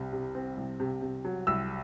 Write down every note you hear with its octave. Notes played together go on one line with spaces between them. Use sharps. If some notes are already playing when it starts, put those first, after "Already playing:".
Already playing: C2 C3
C3
C4
C2
C3
C3
F#3
C2 E6